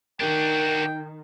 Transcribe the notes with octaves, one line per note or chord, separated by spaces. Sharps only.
D#3 D4 F#4 A#4 G5